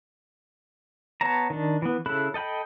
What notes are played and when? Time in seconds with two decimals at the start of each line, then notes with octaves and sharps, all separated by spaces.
1.21 B3 C#5 A5 A#5
1.50 D#3 D4
1.82 E3 B3
2.06 C#3 E4 A4 B5 F#6
2.34 A4 D#5 G5 B5